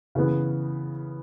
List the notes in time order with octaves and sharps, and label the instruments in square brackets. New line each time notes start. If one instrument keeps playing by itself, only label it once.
[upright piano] C#3 E3 B3